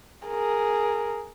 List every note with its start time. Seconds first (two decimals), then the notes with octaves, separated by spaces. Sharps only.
0.27 G#4 A#4